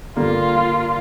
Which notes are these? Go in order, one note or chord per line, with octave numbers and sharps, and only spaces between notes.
G2 D3 G3 A#3 F4